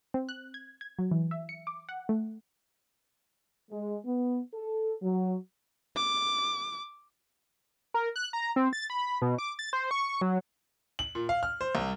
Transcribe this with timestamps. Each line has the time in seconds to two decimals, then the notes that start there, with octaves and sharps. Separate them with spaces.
0.14 C4
0.29 F#6
0.54 G#6
0.81 G#6
0.99 F#3
1.11 E3
1.31 E5
1.49 C#7
1.67 D6
1.89 F#5
2.09 A3
3.71 G#3
4.06 B3
4.54 A4
5.02 F#3
5.96 D6
7.94 A#4
8.16 F#6
8.33 A#5
8.56 C4
8.73 A6
8.90 B5
9.22 B2
9.38 D6
9.59 A6
9.73 C5
9.91 C#6
10.21 F#3
10.99 F#7
11.15 A#2
11.29 F5
11.43 F6
11.61 C5
11.75 C2